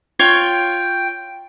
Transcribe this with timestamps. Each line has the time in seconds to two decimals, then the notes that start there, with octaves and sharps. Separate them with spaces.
0.19 F4 C#5 G5 C#6